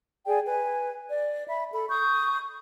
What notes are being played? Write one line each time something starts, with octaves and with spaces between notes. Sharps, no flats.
G#4 D5 G5 G#5
B4 G#5
D5
E5 B5
A4 B5
C#6 D#6 G6